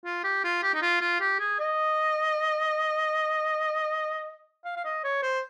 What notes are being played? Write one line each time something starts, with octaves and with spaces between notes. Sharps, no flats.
F4
G4
F4
G4
D#4
F4
F4
G4
G#4
D#5
F5
F5
D#5
C#5
C5